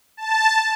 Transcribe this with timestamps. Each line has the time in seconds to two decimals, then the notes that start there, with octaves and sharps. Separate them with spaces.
0.17 A5